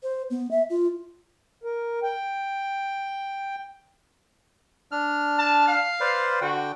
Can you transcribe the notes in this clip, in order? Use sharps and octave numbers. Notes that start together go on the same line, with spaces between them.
C5
B3
E5
F4
A#4
G5
D4 F6
A5
F5
B4 C5 D5
D3 F#4 G5